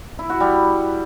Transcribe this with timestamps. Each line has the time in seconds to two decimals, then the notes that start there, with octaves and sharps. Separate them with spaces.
0.19 E4
0.30 F#4
0.40 G3